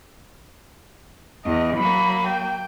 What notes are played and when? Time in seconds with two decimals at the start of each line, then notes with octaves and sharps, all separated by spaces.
1.45 E2 D#5
1.77 F#3 A#3 B5
2.27 G5